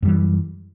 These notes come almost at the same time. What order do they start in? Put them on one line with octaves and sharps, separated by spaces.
F#2 G3 E3